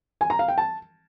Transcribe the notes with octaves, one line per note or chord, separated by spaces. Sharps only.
G#5
A#5
F5
G5
A5